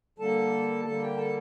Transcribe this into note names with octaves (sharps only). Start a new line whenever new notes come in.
D3 G3 A#3 A4 A5
D3 G3 A#3 A4 A5
G4 G5
A4 A5